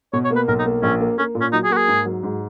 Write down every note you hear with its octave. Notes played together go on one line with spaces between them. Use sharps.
B2 C#5
C#5
A#3
B4
B1 A#4
D#4
A#3
A#1 C#4
A#3
A#3 C#4
A#2
C#4
F#3 D#4
G#4
A#3 F#4
G#4
G#2
F#3
G#2